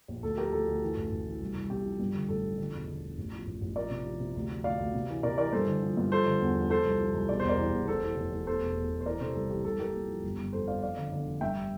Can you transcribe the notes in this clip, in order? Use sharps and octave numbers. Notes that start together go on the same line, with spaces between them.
A#1
D2 A4
F3 G4 A#4
D2 A4
D2
E3
A1
A1
E3
C2
C2
C3 G4
F3
G2
D3
A1 A4
F3
D3
E1
D3
E1
A1
F3
A1
A1
F3 A#4 D5
C3
F3
C3
D2
F3
D2 D5 F5
D2
C3
E3
C3 A#4 D5
E3 A#4 D5
G2 A4 C5
D3
F3
G2
F3 A4 C5
D3
E2
F3
F3 A4 C5
C2
F3
C2
E1 D5
E2 C5
A#4 D5
E3
E2
F1 A4 C5
E3
F1
F1
E2 A4 C5
E1
E2
E1
C5
E3 A#4 D5
C3 A4 C5
C2 A4
E3 G4
C2 A4
C2 G4 A#4
A#2
F3
G1
G1
F2 A4 C5
F2 D5 F5
F2 D5 F5
D3
D3
F1
G2 E5 G5